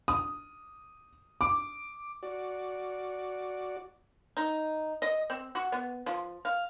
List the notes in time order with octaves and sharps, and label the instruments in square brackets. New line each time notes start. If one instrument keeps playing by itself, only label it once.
[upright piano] D#6
D6
[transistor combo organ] F#4 D5
[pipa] D#4
D#5
C4
F#4
B3
F3
F5